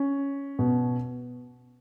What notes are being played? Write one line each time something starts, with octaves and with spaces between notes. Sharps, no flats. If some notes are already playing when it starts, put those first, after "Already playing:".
Already playing: C#4
B2